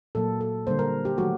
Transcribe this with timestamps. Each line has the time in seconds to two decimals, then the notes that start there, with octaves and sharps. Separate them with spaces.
0.15 A#2 F#3 A#3 A4
0.41 A4
0.66 D3 G3 A#3 C5
0.79 A#4
1.05 G4
1.17 D#3 F#3 A3 F#4